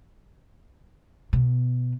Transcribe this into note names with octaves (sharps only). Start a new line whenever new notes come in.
B2